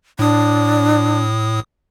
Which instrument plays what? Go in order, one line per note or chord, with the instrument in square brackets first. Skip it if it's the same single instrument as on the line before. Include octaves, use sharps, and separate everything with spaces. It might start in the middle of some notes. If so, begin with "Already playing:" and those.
[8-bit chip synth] A2 D#6 [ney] D4